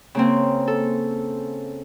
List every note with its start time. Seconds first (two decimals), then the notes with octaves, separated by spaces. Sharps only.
0.15 C#3 A#3 C4
0.68 A4